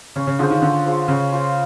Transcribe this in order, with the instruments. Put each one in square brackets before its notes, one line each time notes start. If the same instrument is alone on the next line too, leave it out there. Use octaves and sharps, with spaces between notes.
[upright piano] C#3 [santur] C#4
[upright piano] C#3
[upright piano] D3 [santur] F4 G#4 C5
[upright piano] D#3
[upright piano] D3 [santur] C#4
[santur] F4 G#4 C5
[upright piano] C#3 [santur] C#4
[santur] F4 G#4 C5